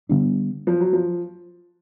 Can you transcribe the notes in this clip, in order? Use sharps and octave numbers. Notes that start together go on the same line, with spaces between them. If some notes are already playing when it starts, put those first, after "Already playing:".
D3 G3 B3 D4
F3
F#3
F3